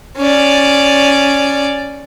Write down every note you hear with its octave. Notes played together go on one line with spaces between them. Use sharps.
C#4 D5